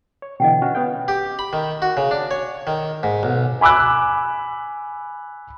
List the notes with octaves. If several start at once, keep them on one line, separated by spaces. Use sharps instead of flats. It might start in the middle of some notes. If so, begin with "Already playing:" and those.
C#5
B2 D3 E3 D#5 F#5 G5
C#4 F#4 B4 F#5
B3 C#4 B4 F5 G5 D#6
G4
B5
D#3
F#4
C#3
D4
C#5
D#3
G#2
B1
G#5 B5 D6 E6 F#6